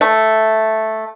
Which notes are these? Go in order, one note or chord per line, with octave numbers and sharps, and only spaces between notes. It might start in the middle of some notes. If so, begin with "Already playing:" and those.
A3